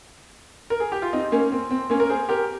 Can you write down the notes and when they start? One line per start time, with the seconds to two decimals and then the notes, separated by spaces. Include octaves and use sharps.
0.70 A#4
0.80 G#4
0.92 G4
1.02 F4
1.13 C4 D#4
1.32 A#3 C#4
1.52 C4
1.71 C4
1.90 A#3 C#4
2.00 A#4
2.09 G#4 C5
2.29 G4 A#4